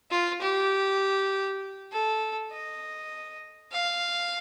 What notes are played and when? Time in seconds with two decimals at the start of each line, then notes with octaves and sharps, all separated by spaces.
0.11 F4
0.41 G4
1.92 A4
2.52 D#5
3.73 F5